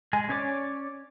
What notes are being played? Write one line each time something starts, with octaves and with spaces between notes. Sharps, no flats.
G#3 G#5
C#4 C#5 D5 D6